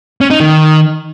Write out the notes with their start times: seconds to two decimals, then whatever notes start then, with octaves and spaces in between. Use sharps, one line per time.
0.21 C#4
0.30 D#4
0.40 D#3